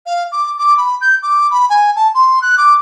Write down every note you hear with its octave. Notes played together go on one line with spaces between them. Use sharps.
F5
D6
D6
B5
G6
D6
B5
G#5
A5
C6
F#6
D6